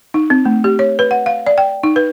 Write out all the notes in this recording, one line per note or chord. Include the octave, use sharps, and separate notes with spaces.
D#4
C4
A3
G4
C#5
B4
F#5
F5
D5
G5
D#4
B4